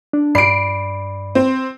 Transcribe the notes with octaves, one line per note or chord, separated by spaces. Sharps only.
D4
G2 D5 B5 C7 D7
C4